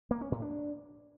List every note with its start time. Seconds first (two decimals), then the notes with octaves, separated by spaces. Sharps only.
0.11 A#3
0.21 C#4
0.32 A2
0.42 D4